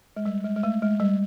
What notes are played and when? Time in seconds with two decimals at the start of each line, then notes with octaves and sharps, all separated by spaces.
0.17 G#3
0.26 G3
0.44 G#3
0.56 G#3
0.63 A3
0.82 G#3
1.00 G3